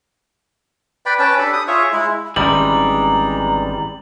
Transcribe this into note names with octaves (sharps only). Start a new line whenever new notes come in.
B4 D5 G5 B5
C#4 B4 G5 A5
D4 G4 A4 B5
D#6
F4 G#4 C#5 E5
G#3 E4
G#1 E3 G3 G#3 C#4 A#5 F#7